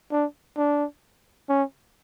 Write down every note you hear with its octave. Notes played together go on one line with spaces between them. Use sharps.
D4
D4
C#4